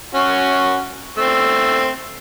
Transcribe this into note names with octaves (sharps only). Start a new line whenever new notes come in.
C#4 F#4
A3 C4